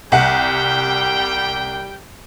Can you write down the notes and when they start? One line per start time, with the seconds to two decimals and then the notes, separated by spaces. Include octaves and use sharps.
0.12 C2 G3 F#5 G5